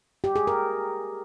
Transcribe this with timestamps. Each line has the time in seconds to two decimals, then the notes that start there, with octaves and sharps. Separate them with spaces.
0.24 G4
0.36 G#4
0.47 A#4